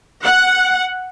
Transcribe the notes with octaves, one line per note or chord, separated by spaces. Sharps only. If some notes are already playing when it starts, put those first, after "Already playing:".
F#5